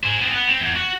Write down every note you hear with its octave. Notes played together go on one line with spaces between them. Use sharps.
G#4 C5
B3 C4
B3
C4
E2
F#4